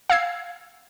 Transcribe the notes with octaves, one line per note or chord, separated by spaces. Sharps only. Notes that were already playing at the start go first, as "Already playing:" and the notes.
F5 E6 G#6 C7